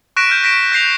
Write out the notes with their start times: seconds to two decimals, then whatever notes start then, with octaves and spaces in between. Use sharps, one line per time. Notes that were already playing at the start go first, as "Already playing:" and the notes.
0.16 C#6 F#6 A#6 B6 D7 E7
0.30 F6 G6
0.44 A#6 B6 D7 E7
0.72 G6 A#6 C7 F7